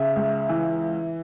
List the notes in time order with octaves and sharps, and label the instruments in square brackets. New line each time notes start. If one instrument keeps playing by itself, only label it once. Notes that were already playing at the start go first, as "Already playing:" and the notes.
Already playing: [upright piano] C#3 [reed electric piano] E5
[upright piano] C#2
E3